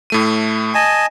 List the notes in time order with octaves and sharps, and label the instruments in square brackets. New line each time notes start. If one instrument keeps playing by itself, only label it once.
[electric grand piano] A2 A3 D#7
[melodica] D#5 G#5 A5